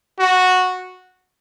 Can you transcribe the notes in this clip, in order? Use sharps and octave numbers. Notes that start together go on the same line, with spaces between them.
F#4